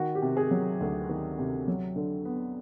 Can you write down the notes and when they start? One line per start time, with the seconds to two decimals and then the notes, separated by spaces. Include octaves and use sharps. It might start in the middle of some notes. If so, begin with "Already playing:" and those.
Already playing: D#3 F#4
0.15 G4
0.22 C3
0.37 G#4
0.51 F#3
0.81 D2
1.09 D#3
1.39 C3
1.68 F#3
1.96 D3
2.25 B3